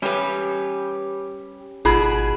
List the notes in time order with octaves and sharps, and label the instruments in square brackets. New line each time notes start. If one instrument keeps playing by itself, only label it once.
[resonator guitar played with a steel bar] G3 B4 [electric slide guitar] C#4 G4
[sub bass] G#1 [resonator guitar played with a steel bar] B2 G#4 [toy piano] D#4 F4 B5